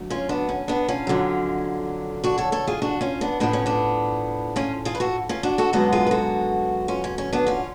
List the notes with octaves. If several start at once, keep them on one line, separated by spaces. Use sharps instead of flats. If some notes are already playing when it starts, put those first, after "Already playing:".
Already playing: D2 F#3 A3
C#4 F4
B3 D4
C#4
B3 D4
C#4 F4
F2 D3 F#3
D4 F#4
A4 C#5
A4 C#5
F4 G#4
D4 F#4
C#4 F4
B3 D4
A2 F3 B3 D4
C#4
B3 D4
C#4 F4
F4 G#4
B4
F#4 A4
C#4 F4
D4 F#4
F#4 A4
F#2 D3 G#3 B3 F#4 A4
F4 G#4
B4
F#4 A4
C#4 F4
C#4
C#4
B3 D4
C#4 F4